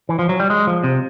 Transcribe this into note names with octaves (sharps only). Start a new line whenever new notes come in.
E3
F3
F#3
G3
G#3
F3
C3